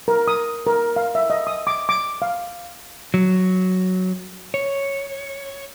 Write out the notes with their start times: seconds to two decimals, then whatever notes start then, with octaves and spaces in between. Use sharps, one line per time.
0.08 A#4
0.28 D#6
0.67 A#4
0.96 F5
1.15 E5
1.30 D#5
1.47 D#6
1.67 D6
1.89 D6
2.22 F5
3.14 F#3
4.54 C#5